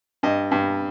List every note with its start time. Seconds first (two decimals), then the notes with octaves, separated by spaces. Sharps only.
0.23 G2 D#5
0.51 G2